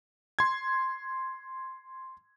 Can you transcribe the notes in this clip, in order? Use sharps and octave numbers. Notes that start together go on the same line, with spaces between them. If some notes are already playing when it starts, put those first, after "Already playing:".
C6 G#6